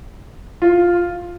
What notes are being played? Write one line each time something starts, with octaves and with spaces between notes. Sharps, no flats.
F4